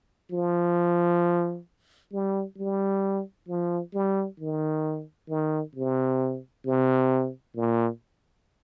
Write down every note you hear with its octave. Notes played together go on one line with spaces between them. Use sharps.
F3
G3
G3
F3
G3
D#3
D#3
C3
C3
A#2